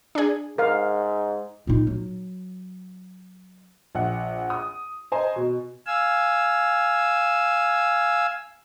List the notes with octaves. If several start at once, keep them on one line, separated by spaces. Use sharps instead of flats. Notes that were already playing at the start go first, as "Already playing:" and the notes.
D4 G#4
G#2 A#4 F5
A#2 D#4
F#3
A#1 F#5
D#6
C5 D#5 G#5 A#5
B2
F5 G#5 E6